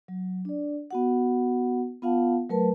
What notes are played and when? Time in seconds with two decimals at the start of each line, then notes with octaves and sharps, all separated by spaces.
0.08 F#3
0.45 D4 D5
0.91 B3 F#4 F#5
2.02 B3 F4 F5 F#5 A5
2.49 F#3 A3 A#4 B4 A5